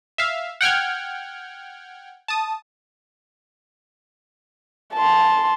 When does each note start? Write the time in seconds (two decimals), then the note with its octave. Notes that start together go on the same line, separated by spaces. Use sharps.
0.18 E5 F5
0.61 F#5 G5 F6 G#6
2.28 A5 D#6
4.94 A5 C6